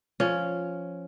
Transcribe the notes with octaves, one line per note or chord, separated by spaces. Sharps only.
F3 C#4